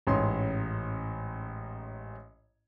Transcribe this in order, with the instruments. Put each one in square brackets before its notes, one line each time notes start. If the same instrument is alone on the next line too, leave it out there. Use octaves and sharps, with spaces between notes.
[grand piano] A1 G#2 C#4 C#5 C6